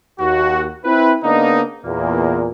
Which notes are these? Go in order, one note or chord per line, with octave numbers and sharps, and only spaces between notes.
D#2 F#4
C4 E4 B4
C#3 A#3 B3 D4 D#4
E2 A#2 A#3